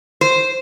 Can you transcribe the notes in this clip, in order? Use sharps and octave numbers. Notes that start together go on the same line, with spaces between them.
C5